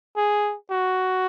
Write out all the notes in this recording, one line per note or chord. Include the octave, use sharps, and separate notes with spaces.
G#4
F#4